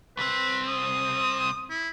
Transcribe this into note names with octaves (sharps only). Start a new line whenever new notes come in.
C2 C4 B4
D#6
E4